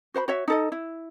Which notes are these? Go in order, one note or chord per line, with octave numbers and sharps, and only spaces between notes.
F#4 C5 F#5 B5
F#4 C#5 E5
D#4 A4 D#5
E4